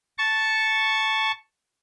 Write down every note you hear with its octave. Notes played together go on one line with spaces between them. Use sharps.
A5 C#6